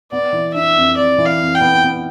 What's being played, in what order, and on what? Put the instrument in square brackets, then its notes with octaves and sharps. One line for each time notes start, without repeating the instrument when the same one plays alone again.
[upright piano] B3 [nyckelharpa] D5
[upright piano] E3
[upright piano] D4 [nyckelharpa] E5
[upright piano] F2
[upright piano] F2 [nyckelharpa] D5
[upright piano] E3
[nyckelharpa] F5
[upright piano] F2
[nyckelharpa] G5
[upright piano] B3
B3